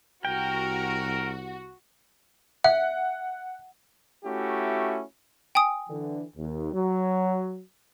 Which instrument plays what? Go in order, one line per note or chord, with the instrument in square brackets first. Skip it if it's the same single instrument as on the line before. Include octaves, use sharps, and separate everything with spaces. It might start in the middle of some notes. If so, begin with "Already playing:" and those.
[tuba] C2 [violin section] F#4 [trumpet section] A#4 [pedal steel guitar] G5
[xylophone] E5 [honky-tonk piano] F#5
[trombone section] A3 C#4 E4 F#4 G4
[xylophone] G5 G#5 D#6
[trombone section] D3 E3
D#2
F#3